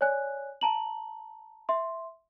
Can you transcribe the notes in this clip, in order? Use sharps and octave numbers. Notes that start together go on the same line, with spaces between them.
C#5 D5 G#5 F#6
A5 A#5 F#7
E5 C6